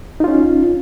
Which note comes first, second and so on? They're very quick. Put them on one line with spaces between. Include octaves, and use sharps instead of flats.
D#4 F4 C#4